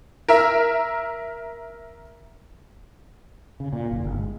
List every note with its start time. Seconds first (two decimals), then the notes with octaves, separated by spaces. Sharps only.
0.29 A#4 E5
3.60 C#3
3.73 A#2
3.91 F#1
4.04 G1
4.19 G#3